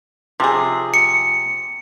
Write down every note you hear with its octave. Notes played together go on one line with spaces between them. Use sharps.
C3 F3 G#4
C#7